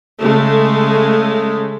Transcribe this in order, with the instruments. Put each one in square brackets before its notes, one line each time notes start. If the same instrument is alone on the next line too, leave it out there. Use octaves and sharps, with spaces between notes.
[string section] C#3 G#3 A3